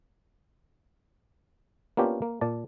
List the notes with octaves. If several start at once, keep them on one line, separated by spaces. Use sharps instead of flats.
A#3 B3 C#4 D4 F4 G4
A#3
A#2 D5 A5